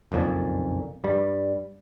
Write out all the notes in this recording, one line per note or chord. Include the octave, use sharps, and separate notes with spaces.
F#1 B1 F2 A#2
G2 G3